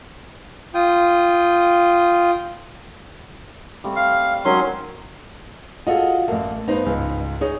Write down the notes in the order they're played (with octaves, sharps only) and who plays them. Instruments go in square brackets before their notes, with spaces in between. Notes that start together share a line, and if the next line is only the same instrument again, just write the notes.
[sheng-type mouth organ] F4 G5 D#6
[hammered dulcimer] G3 A3 C4
[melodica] F5
[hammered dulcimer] D#3 G#3 D#4 [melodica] F#3 C#4 C6
[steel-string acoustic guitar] F4 F#4 [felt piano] G#4 A4 D#5
[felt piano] A1 A3 [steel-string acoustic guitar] A#3
[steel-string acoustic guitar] G2 D#4 [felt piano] B3 C5
[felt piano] C#2 G#2
[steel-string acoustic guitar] D#4 [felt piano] G#4 C#5